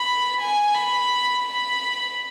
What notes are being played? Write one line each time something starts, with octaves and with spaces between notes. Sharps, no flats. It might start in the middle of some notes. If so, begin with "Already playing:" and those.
Already playing: B5
G#5
B5
B5